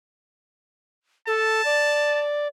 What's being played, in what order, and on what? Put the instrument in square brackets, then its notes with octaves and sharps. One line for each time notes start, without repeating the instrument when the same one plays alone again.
[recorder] A4 [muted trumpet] A5
[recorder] D5